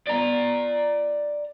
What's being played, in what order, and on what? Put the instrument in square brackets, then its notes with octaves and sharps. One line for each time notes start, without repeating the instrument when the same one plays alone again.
[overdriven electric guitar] D5 A#5